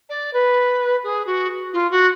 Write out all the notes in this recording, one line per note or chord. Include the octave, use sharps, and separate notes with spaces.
D5
B4
G#4
F#4
F4
F#4